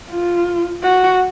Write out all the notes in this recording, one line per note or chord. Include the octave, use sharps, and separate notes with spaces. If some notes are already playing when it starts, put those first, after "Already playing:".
F4
F#4